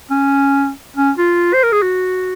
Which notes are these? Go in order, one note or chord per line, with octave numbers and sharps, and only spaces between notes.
C#4
C#4
F4
C5
A#4
G#4
F#4